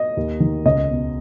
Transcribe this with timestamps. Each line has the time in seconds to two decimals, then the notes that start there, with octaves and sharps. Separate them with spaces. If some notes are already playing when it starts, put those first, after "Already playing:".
Already playing: D#5
0.17 D#2
0.40 D#3
0.65 C#2 D#5
0.90 B2